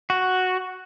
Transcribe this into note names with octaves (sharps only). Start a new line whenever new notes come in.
F#4